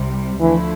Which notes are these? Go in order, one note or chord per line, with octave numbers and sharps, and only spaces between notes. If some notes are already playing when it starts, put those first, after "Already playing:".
Already playing: C2 C3 G3
D2 D3 E3 F3 A3 E4